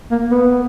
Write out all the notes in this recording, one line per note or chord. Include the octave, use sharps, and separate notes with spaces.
A#3
B3